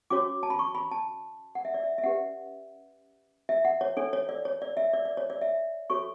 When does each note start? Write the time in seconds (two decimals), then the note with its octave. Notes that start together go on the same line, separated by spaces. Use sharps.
0.10 C#4 F#4 C#5 D6
0.43 A5
0.50 B5
0.59 C#6
0.75 B5
0.91 A5
1.55 F#5
1.65 E5
1.74 D5
1.84 E5
1.98 E5
2.04 C#4 G4 B4 F#5
3.49 E5
3.65 F#5
3.81 C#5
3.97 D4 A4 C#5
4.13 C#5
4.29 D5
4.45 C#5
4.62 D5
4.77 E5
4.93 D5
5.05 D5
5.17 C#5
5.30 D5
5.41 E5
5.90 F#4 A4 C#5 C#6